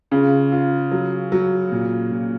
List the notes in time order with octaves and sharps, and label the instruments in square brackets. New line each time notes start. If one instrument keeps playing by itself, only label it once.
[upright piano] C#3 [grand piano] F4
[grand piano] F4
F#3
F#3
A#2
A#2